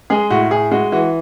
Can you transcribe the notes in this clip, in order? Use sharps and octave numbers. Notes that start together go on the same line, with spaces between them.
G#3 G#4
A2 F#4
A2 G#4
G#3 F#4
E3 F#4